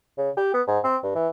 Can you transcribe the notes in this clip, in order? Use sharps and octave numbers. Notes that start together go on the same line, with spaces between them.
C#3
G4
B3
G#2
C4
G2
E3